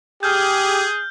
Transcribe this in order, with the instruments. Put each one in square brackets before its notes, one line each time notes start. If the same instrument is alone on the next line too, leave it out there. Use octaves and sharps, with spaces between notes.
[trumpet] G4 [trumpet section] G#4 [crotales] F6 G6